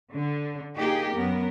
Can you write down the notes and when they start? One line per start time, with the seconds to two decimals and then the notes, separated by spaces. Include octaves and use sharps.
0.13 D3
0.77 A#3 D#4 G4 G#4
1.14 F#2 B3 A#4